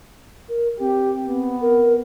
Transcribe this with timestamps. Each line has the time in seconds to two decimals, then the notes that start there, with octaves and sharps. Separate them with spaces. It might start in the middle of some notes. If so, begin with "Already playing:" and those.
0.49 A#4
0.80 C4 G4
1.27 B3
1.61 A#4